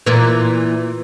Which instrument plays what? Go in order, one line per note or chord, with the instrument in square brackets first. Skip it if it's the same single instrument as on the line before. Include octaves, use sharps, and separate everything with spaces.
[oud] A#2 E3